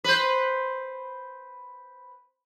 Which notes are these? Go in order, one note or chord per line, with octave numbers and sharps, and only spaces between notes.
B4 C5